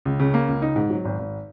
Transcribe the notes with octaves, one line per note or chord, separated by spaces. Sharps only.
C#2
C#3
A#3
C#2
D#4
G#2
F#3
G#1
G#1